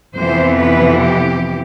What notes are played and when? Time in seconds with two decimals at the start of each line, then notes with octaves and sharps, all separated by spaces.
0.15 F2 C3 E3 B3 C5
0.60 B4
1.03 G4